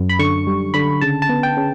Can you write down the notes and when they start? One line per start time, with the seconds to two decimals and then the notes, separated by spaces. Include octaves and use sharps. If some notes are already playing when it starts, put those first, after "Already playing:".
Already playing: F#2
0.09 B5
0.19 D3 C#6
0.47 G3
0.74 D3 B5
1.01 C#3 A5
1.22 A5
1.29 B3
1.43 G5
1.57 C#3